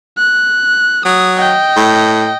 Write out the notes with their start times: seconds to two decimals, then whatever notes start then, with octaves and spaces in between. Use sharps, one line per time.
0.18 F#6
1.06 F#3 D#6
1.38 D#5 G5
1.77 A2